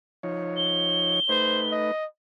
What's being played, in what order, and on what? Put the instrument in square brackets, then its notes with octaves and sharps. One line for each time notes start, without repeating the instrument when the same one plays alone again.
[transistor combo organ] F3 D#4 C#5
[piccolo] G7
[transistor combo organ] A3 D#4 B4 [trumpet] C5
[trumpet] D#5